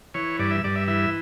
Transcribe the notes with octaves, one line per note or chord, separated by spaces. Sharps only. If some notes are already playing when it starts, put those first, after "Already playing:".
E3 C#5
G2 D5
E5
G2 D5
E5
E3 E5